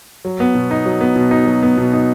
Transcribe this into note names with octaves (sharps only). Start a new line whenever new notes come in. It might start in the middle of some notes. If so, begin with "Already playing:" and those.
F#3
B3
B2
D#4
F#3
B3
B2
D#4
F#3
B3
B2
D#4